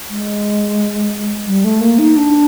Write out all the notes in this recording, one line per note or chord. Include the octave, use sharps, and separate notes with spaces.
G#3
G3
A3
A#3
D#4
D4